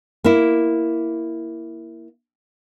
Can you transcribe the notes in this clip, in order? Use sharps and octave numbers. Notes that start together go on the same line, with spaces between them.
A#3 E4